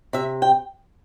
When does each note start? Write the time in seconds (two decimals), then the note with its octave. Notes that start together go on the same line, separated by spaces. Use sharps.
0.13 C3 E5
0.42 G5